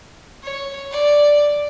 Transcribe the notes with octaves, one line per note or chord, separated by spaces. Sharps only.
C#5
D5